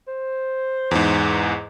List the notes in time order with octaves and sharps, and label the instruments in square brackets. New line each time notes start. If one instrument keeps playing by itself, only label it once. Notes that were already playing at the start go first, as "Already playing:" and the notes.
[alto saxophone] C5
[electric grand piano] E2 G#2